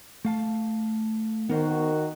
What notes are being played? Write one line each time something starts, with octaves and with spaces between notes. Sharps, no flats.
A3 F5 A5
D#3 B3 F#4 A#4 C5